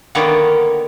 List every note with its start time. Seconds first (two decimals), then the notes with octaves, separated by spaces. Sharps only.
0.15 D3 D#3 A#3 B3 C#5